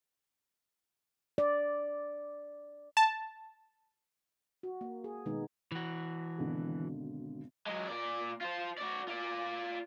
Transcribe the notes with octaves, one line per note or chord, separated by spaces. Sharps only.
D5
A5
F#4
A#3
G#4
B2 D#3 G#3 B3 D#4
E3 F#4
G#1 B2 D3
F#3 G#3
A#2 D5
F4 C5
F#4 D5
F4 D5